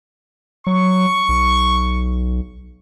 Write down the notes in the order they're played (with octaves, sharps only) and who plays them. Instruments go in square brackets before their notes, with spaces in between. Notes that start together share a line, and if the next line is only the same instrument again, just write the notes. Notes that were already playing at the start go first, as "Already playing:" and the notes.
[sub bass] F#3 [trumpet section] C#6
[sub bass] B1